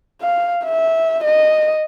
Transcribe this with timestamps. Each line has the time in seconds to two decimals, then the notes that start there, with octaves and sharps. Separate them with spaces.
0.22 F5
0.64 E5
1.24 D#5